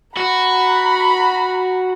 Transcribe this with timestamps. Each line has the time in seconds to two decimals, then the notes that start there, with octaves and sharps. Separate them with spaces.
0.17 F#4 A#5 B5